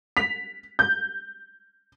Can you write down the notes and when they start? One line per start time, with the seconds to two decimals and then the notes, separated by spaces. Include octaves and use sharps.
0.17 B6 F7
0.79 G6